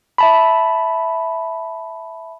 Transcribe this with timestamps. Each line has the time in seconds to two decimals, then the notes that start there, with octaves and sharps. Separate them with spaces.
0.18 E5 A5 B5